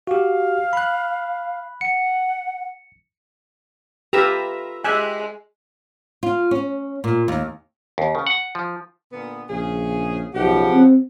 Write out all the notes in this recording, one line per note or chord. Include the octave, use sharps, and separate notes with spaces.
F#4 G4 F5
B5 F#6
F#5 C#7
F4 G4 A4 B4 E5 A#5
G#3 G4 E5 G#5 F#6
F4
C#4
A#2
D#2
D#2
C#3
F#5
F3
A#2 D3 B3
A#1 C#3 G#4
B1 C#3 F3 G4 F#5
C4